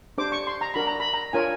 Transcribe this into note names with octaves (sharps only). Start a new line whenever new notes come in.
D4 G4 C5 D6
C#6
C6
A#5
D4 F#4 A#4 B5
A#5
B5
A#5
D4 F4 A#4 C#5 G#5